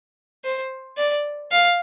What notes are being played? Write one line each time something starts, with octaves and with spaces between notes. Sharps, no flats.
C5
D5
F5